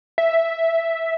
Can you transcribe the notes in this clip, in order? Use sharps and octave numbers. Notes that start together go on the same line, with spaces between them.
E5